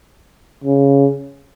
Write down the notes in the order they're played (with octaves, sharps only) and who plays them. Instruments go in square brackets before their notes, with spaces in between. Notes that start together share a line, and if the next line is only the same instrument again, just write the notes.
[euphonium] C#3